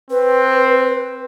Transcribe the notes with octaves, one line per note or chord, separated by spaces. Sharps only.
C4 B4